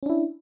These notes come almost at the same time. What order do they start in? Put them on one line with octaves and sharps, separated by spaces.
C#4 D4 E4